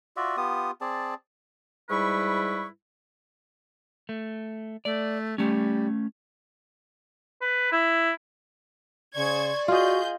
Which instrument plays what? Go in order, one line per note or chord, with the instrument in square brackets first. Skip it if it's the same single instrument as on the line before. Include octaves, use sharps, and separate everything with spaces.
[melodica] F4 F#4 D5 E5
B3 F4 G4 D#6
C4 G#4 D5 A5
[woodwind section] G#2 G3 E4 B4 C#6
[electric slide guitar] A3
[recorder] A3 [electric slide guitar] D5
[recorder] G3 [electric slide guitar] A3 C#4
[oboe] B4
E4
[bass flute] C#3 [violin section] C5 C#6 G#6 [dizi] D5
[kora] F4 D#5 [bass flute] F#4 [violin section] G#4 G6